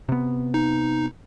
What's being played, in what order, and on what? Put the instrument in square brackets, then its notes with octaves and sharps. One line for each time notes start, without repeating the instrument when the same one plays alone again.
[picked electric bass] C3 B3
[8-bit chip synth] D#4